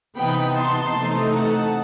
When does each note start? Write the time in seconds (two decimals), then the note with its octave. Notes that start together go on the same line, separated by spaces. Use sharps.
0.17 C3 E3 B3 D#4 G5 B5
0.56 A5 C6
0.95 C3 E3 A3 D#4
1.33 F#5 A5